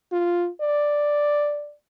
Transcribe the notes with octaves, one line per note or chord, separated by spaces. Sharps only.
F4
D5